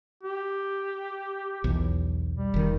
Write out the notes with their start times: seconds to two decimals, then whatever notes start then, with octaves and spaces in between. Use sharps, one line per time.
0.23 G4
1.64 B1 E2
2.36 G3
2.54 F1 D#3